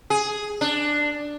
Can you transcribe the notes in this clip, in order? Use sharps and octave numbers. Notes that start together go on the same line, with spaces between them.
G#4
D4